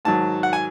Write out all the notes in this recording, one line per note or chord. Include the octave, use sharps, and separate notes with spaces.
G#2 D#3 F#3 A5
F#5
G#5